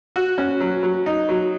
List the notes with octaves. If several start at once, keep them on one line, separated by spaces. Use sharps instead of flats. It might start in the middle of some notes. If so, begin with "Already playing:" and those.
F#4
C#4
F#3
F#3
D#4
F#3